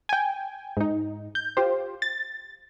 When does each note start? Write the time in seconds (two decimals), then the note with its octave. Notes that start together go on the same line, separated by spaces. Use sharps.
0.09 G5 G#5
0.77 G#2 D#4
1.35 G6
1.57 F4 G4 C5
2.02 A6